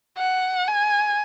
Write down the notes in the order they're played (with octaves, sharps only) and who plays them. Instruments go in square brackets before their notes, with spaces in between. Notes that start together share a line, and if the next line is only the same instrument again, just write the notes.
[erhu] F#5
G#5